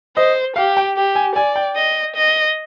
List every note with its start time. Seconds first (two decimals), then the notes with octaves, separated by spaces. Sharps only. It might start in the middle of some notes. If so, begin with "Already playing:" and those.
0.16 C5 D#5
0.56 G4 F5
0.77 G5
0.97 G4
1.16 G#5
1.36 D5 G#5
1.56 G5
1.76 D#5
2.16 D#5